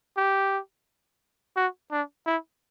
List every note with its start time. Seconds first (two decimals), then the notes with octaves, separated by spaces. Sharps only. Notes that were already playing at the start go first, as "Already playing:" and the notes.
0.17 G4
1.56 F#4
1.92 D4
2.26 E4